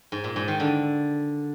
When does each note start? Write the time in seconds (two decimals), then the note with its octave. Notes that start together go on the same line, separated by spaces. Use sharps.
0.12 G#2
0.24 A#2
0.36 G#2
0.48 D#3
0.60 D3